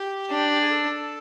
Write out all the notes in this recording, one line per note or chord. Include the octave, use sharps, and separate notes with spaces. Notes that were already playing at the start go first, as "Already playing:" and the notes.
Already playing: G4
D4
G#4
A4